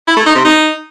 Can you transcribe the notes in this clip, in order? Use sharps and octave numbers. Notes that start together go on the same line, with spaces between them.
E4
A3
D#4
C3
D#4